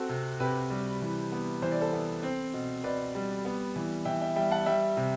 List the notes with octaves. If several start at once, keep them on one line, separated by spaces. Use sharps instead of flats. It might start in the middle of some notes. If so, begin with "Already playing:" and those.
Already playing: C4 F#4 A4
C3
C3 G4 B4
G3
E3
B3
E3 C5
D5
A4 C5
B3
C4
B2
B2 B4 D5
G3
B3
E3
E3 E5 G5
E5 G5
G3 E5 G5
F#5 A5
G3 E5 G5
C3